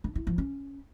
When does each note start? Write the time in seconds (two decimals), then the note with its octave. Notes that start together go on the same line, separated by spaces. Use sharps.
0.04 D4
0.15 E4
0.27 F3
0.38 C#4